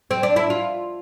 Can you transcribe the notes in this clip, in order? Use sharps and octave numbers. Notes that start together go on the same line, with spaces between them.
C4
D4
E4
F4